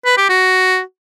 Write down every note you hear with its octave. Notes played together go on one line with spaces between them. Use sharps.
B4
G4
F#4